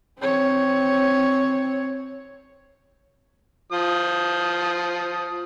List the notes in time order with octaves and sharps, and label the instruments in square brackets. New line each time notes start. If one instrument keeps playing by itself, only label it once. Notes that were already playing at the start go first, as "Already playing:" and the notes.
[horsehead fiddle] C4 C#5
[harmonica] F3 D#6